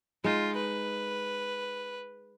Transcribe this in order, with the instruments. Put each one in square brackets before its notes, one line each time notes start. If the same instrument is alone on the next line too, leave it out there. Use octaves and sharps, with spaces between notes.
[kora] G#3 D#4 [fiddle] F4
[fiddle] B4